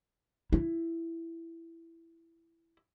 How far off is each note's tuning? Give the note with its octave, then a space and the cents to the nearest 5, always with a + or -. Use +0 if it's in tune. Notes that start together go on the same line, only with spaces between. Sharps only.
E4 +10